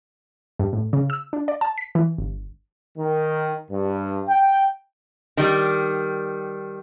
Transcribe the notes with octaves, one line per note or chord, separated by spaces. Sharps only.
G2
A2
C#3
E6
D4
D5
A5
B6
E3
G1
D#3
G2
G5
D#3 G3